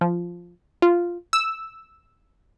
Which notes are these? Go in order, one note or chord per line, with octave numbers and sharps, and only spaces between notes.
F3
F4
E6